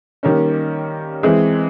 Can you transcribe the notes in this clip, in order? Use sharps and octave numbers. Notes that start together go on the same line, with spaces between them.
D#3 G3 A#3 C#4
E3 G#3 C4 E4 G#4